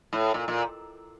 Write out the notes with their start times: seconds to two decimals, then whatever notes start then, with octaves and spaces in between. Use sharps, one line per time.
0.13 A2
0.34 A#2
0.48 A#2